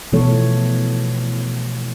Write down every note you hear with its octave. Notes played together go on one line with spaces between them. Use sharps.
B2 E3 F3 A3 A4 C#5